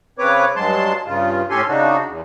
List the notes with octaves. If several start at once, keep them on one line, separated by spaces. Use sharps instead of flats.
C#3 C4 B4 C#5 D6
G2 F#3 G#3 A5 C6
G2 C#3 F4
A2 C#4 G4 A4 G#5 C6
C#3 D4 D#4 F#4
E2